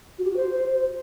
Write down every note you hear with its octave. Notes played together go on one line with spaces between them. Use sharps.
F#4
G4
F#4
C5